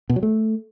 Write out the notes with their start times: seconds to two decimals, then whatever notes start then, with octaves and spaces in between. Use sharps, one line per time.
0.10 B2
0.16 F#3
0.23 A3